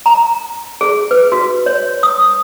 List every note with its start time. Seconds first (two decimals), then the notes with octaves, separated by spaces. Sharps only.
0.06 A#5
0.81 G#4
1.11 B4
1.32 F#4
1.66 C#5
2.03 D#6